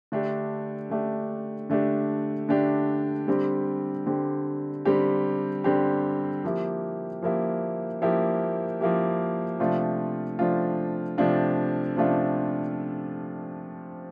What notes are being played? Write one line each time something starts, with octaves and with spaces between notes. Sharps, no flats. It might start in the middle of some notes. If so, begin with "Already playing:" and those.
D3 A3 D4 G4
D3 A3 D4 G4
D3 A3 D4 G4
D3 A3 D4 G4
D3 G3 C4 G4
D3 G3 C4 G4
D3 G3 C4 G4
D3 G3 C4 G4
F3 A#3 E4 G4
F3 A#3 E4 G4
F3 A#3 E4 G4
F3 A#3 E4 G4
C3 F3 A3 D4 F4
C3 F3 A3 D4 F4
C3 F3 A3 D4 F4
C3 F3 A3 D4 F4